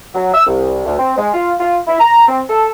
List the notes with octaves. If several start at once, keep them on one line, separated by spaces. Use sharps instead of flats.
F#3
E6
C2
D2
C4
G#3
F4
F4
E4
A#5
C4
A4